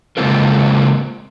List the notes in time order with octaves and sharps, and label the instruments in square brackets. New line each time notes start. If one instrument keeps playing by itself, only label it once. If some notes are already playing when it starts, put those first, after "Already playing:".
[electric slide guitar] C#3 G#3 A#3 C4 F4 A#4